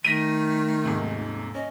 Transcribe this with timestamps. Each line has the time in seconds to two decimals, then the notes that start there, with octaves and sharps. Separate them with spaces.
0.04 D#3 A3 A#6 B6 D#7
0.84 D#1 G#2 C3
1.55 C#4 D#5